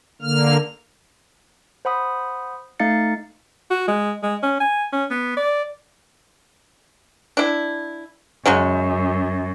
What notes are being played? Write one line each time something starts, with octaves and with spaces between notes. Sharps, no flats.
D3 A#3 F6
C5 F#5 B5 D#6
A3 D#4 F5 A6 C#7
F#4
G#3
G#3
C#4
G#5
C#4
B3
D5
D4 E4
F#2 C#3 F#3 G#3